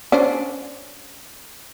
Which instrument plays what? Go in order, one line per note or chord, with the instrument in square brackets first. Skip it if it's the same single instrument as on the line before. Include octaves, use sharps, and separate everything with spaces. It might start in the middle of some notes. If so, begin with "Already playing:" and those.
[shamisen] C#4 D4 C5